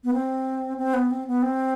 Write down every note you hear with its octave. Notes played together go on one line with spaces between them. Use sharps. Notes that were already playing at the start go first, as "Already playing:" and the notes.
B3
C4
C4
B3
C4
B3
C4